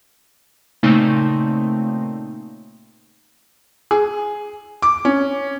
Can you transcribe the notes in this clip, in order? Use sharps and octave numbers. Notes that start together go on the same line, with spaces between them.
A#2 C#3 A3 A#3 C4 D#4
G#4
D6
C#4